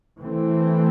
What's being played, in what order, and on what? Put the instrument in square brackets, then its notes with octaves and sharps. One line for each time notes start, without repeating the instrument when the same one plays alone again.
[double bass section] E3 A3 C4